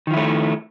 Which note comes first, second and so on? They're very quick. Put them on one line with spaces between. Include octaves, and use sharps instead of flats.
D#3 F3 E4 A3